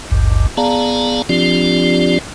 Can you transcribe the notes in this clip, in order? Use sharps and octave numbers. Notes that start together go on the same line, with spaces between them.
G#1 D2 G2
B3 G#4 D5 F5 A5 A#5
F3 C4 D4 F4 G4 D5